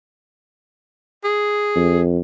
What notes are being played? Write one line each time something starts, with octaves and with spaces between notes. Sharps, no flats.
G#4
F2